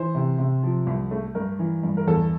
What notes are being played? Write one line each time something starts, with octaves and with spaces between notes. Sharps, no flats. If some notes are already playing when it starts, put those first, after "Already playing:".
Already playing: E3 C5
C3
C3
F3
C2
A3
G2 A#4
E3
G2
A#4
E2 A4